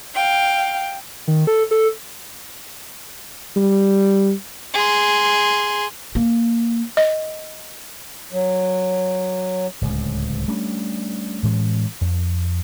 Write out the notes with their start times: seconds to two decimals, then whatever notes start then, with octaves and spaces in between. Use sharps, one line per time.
0.15 F5 G5
1.28 D#3
1.47 A4
1.71 A4
3.56 G3
4.74 G#4 C6
6.15 A#3
6.97 D#5
8.33 F#3
9.81 D1 C#2
10.48 G3 A3 C#4 D4
11.43 A2 E3 G#3 C#4
12.01 F2